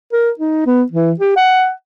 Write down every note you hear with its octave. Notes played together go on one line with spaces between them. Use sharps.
A#4
D#4
B3
E3
G4
F#5